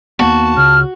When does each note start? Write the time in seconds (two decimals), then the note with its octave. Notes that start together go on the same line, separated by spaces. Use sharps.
0.19 D#2 A#3 B3 F#4 A5
0.57 C#2 C#3 F6